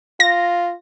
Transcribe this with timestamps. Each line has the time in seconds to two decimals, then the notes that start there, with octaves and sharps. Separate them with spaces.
0.20 F4 A#6